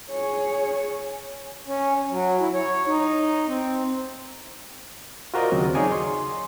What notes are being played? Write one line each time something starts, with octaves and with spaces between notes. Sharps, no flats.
G#4 C#5
C#4
F#3
E4
C#5
D#4
C4
F4 F#4 A#4 C5 D5 D#5
D#2 C#3 F#3 C4
D#4 G#4 C#5 D5 G#5 D6
C6